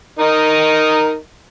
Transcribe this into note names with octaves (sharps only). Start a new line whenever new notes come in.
D#4 A#4 D#5